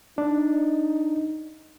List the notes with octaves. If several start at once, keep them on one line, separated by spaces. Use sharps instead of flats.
D4 D#4